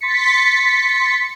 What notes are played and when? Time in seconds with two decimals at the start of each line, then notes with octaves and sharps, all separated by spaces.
0.01 C6 A6 B6 C#7